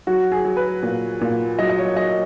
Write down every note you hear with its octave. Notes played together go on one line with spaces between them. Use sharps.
F#3 F#4
G#4
F#3
B4
A#2
A#2
F#3 D#5
D#5
C#5
F#3 D#5